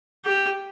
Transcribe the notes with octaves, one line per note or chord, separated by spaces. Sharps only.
G4